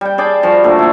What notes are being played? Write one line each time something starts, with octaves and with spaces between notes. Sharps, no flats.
G3 G5
G#4 D5 G5 A5
F3 G3 F#4
A#2 D3 A3
E4 A4